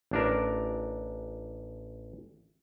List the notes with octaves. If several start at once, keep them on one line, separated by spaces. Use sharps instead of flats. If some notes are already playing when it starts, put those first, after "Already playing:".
A1 D4 A#4